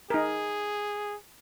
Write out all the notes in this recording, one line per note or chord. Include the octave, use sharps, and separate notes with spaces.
D#4 G#4 A#4